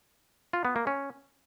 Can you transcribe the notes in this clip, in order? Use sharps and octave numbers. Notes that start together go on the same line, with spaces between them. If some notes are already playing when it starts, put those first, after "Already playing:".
F4
B3
A#3
C#4